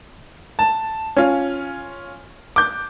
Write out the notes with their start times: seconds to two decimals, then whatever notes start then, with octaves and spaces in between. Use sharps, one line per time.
0.59 A5
1.17 C#4 F4
2.56 D6 G6